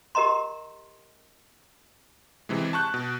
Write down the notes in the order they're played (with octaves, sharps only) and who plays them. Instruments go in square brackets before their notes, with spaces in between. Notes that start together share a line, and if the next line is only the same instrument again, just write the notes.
[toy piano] G4 A#4 D#5 A#5 C6
[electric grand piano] C3 E3 G#3
A5 C#6 F#6 G6
B2